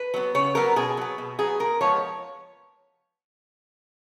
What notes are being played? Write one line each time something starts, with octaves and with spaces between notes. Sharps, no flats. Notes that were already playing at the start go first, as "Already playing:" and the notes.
Already playing: B4
F#3 B3
C#3 C#5
F#3 B3 A#4
B2 G#4
F#3 B3
B2
F#3 B3 G#4
A#2 A#4
F3 G#3 B3 C#5